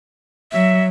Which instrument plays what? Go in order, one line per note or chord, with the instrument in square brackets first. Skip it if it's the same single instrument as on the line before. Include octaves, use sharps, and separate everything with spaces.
[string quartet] F#3 [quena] E5